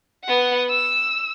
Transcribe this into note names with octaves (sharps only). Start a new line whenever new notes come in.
B3 F#5
E6